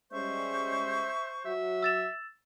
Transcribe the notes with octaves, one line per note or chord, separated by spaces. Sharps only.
G3 G#3 C#4 C5 E5 C#6 G6
F#3 F#4 E5
E6 A6 E7